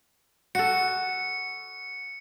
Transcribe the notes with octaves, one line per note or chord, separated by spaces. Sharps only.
F#4 A4 C#7